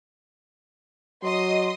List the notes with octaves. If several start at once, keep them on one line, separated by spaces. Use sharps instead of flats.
F#3 D#5 C6 D#6